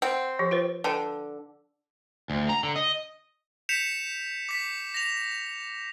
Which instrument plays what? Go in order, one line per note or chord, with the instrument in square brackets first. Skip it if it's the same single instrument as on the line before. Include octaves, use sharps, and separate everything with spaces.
[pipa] C4 [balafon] F#5
[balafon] F3 G4
F4 B4 C5
[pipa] D3 [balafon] B4 G5 A5
[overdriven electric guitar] D2
A#5
D3
D#5
[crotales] G6 B6 C#7 E7 F7
D6 B6
A#6 F7